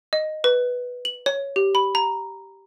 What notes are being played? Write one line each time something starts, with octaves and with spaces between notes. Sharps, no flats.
D#5
B4
F#7
C#5
G4
B5
A#5